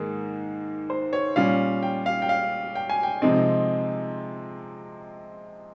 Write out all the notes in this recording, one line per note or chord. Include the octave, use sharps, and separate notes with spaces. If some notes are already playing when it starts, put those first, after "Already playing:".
Already playing: G#2 D#3 A#3 G#4
C5
C#5
A#2 G3 C#4 F5
G5
F5
G5
F5
G5
G#5
G5
C3 F3 G#3 C4 D#4